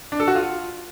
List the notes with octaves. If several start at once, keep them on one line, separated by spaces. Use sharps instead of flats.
D4
A4
F#4
F4